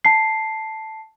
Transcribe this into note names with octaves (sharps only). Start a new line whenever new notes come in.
A5 C7